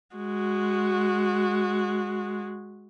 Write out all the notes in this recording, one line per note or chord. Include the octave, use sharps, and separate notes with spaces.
G#3 F#4